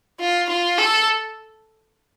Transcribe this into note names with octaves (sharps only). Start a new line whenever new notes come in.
F4
F4
A4